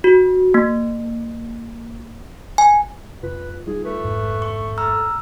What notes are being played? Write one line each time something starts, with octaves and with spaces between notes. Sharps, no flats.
F#4
A#3
G#5
F2 C3 F4 B4
G3 D#4 F4 G#4
A3 B4
A1 F2 G#2
C#6
A4 A#5 E6 F6